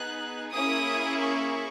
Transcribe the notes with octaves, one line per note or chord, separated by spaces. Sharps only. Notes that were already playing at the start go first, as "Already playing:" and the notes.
Already playing: B3 D#4 G#4 F#6
A#3 C#4 E4 G#4 D#6
C#6